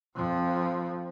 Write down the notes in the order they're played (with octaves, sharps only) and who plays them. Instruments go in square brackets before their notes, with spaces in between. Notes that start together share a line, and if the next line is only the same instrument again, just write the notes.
[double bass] F2 F3